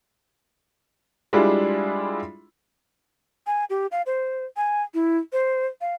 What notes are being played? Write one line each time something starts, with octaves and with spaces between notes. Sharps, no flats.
G3 G#3 D4 E4 F4 G#4
G#5
G4
F5
C5
G#5
E4
C5
F5